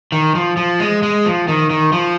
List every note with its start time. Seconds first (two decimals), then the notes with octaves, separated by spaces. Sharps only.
0.12 D#3
0.35 F3
0.57 F3
0.80 G#3
1.03 G#3
1.25 F3
1.48 D#3
1.70 D#3
1.93 F3